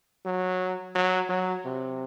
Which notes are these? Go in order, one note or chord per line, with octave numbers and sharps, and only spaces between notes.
F#3
F#3
F#3
C3